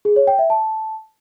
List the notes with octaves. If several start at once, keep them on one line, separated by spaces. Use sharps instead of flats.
G#4
C#5
G5
E5
A5